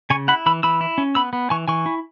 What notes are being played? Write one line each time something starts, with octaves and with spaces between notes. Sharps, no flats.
C#3 G#5 C#6
E4 F#5 B5
E3 B5 E6
E3 B5 E6
E4
C#4
B3 B5 E6
B3
E3 G#5 C#6
E3 G#5 C#6
E4